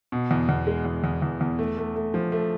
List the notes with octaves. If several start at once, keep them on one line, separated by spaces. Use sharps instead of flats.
B2
E2
E2
G#3
E2
E2
E2
E2
A3
A3
A3
F3
A3